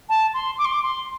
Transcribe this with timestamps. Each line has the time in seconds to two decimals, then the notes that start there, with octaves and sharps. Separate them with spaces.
0.09 A5
0.34 C6
0.58 D6
0.65 C6
0.72 D6
0.83 C6